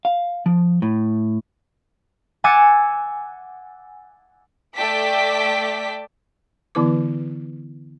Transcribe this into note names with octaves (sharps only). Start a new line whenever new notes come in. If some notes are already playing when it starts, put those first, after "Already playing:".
F5
F3
A2
F#5 G#5 D6 E6 A6 C#7
A3 D5 G5 A5 D6 B6
D3 E3 B3 E4 B4 D6